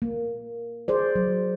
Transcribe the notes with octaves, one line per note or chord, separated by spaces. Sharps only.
A#3
G#4 C5 D5
F#3